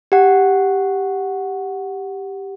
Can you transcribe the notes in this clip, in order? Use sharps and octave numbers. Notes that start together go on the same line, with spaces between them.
G4 F#5